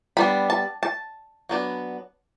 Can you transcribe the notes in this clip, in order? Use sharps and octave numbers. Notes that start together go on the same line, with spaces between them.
G3 B3 D4 B5
A5
A5
F#3 B3 D4